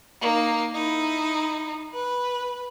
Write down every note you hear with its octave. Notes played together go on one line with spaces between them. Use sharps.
A#3 D#4
D#4 E4
B4